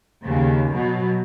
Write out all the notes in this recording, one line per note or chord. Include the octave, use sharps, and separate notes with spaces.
D#2 C#3
B2 F#3